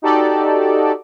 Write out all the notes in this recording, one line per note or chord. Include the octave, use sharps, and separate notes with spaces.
D#4 F#4 G4 A4 D5